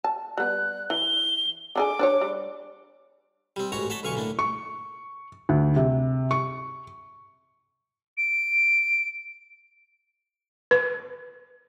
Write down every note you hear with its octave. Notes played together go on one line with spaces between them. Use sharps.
A5
G3 B3 F#6
E3 G7
D3 D#4 G#4 D6
D4 C5 C#5
G3
G3 C4
A1 G#2 F#4 C#5 A#5
C#5 F#5 A5 B5 C6
B1 D3 F5 G#5 C#6
A2 A#3 D4
C#6
D2
C3
C#6
D7
B4